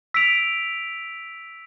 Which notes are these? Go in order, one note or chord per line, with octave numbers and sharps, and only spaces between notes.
E6 B6 D7 F7